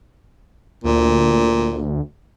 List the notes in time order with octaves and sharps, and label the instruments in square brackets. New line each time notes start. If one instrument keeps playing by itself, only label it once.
[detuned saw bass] D2 [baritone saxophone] A#2